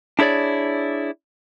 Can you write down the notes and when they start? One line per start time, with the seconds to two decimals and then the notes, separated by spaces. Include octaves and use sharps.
0.19 D4 E4 G#4 C#5 D5